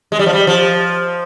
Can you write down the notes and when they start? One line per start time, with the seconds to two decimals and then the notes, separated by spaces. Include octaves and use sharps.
0.12 G#3
0.19 G3
0.26 F3
0.33 G3
0.47 F3